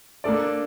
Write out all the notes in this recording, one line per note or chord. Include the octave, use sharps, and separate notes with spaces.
A#3 D4 A4 D5